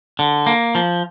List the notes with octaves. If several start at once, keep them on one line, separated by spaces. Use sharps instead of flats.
D3
A#3
F3